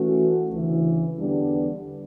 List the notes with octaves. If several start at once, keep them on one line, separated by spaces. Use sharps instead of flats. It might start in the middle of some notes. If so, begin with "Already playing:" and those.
Already playing: E3 A3 C#4 F#4
D2 C#3 E3
E2 D3 G3 B3 D4